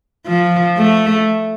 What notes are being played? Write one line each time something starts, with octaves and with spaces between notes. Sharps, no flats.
F3
A3